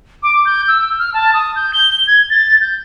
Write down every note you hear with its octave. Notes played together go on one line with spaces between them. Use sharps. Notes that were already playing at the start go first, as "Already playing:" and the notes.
D6
G6
E6
F6
A5
D#6
G6
G7
G#6
A6
G6